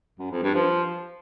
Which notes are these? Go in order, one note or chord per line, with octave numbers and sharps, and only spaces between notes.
F#2
F2
G2
F3